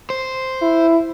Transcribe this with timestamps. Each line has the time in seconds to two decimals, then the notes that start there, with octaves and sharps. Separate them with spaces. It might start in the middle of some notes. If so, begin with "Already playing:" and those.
0.10 C5
0.62 E4